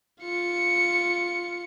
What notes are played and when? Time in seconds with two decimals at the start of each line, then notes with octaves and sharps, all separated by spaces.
0.21 F4 C#7